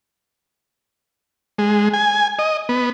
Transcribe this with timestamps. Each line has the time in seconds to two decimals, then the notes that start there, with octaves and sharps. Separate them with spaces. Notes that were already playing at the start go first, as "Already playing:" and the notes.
1.58 G#3
1.94 G#5
2.39 D#5
2.69 B3